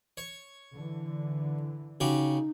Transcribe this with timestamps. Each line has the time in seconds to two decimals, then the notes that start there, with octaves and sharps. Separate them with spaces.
0.17 C#5
0.72 D3 E3
2.00 C#3 D#4 F#4 G4